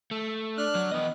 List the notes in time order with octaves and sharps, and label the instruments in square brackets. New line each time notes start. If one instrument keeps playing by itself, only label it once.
[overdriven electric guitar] A3
[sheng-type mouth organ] D4 F6 F#6
[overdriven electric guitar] F#3
[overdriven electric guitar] E3 D#5 [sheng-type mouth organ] B3